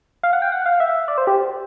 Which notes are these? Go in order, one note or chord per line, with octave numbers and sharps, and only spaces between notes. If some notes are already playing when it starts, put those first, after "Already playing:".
F5
F#5
G5
F#5
F5
E5
D5
C5
G4